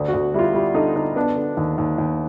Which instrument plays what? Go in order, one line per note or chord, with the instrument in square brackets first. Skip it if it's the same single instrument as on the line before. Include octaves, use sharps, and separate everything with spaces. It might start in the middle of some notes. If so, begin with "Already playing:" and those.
Already playing: [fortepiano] D2
F#4
D2
G3 E4
F4
G3 E4
D3 D#4
D3 D#4
B3 D4
D3
D#2
D#2
D#2